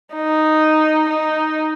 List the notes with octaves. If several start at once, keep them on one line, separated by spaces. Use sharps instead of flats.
D#4
D#4